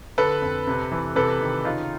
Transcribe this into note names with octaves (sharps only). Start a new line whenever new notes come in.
D3 A4 B4
F2
C3
E3
C3 A4 B4
D#3
C#3 D#4 F4